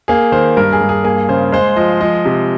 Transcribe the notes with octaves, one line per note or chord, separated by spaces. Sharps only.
A#3 G#4
D#3 C5
G2 A#4
G#4
G2
G#4
A#3 G#4
C#3 C5
G#3 C5
F3 D#5
F3 D#5
C3